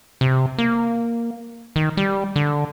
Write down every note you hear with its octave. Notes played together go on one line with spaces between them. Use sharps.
C3
A#3
D#3
G3
D3